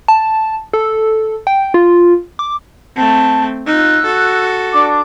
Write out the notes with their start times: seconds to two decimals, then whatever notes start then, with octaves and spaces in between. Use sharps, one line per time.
0.08 A5
0.74 A4
1.47 G5
1.74 F4
2.39 D6
2.96 A3 C4 A5
3.67 D#4 F4 E6 F#6
4.05 F#4 A4
4.73 D4 D6